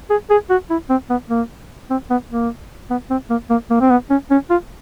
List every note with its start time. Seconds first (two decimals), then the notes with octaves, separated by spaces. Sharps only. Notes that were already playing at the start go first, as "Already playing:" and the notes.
0.10 G#4
0.30 G#4
0.50 F#4
0.70 E4
0.90 C4
1.10 B3
1.30 A#3
1.90 C4
2.10 B3
2.31 A#3
2.90 B3
3.10 C4
3.30 A#3
3.50 A#3
3.70 A#3
3.81 C4
3.90 B3
4.10 C#4
4.31 C#4
4.50 F4